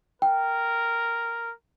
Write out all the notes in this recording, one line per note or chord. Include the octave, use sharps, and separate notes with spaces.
A#4 G5